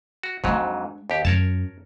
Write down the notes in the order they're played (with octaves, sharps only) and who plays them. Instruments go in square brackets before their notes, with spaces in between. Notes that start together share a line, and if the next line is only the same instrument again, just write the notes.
[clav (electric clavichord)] F#4
[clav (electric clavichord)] F2 G#2 F#3 [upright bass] G#3 D4
[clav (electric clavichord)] D#2 G4
[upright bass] F#2 [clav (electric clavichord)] A#4 C#5 A5